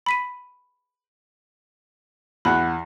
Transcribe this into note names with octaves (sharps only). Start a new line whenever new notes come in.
B5 B6 D#7
E2 F#5 B5